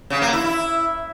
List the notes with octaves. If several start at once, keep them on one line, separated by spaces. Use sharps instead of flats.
C#3
A#3
E4
E4